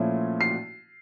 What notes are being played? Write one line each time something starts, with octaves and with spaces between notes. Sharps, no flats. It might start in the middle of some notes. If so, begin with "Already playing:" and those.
Already playing: A#2 F3 A3 C#4 E4
C7